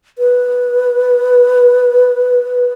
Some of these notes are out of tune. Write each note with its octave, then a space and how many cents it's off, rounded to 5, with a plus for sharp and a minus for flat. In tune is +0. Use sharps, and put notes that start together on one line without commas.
B4 -5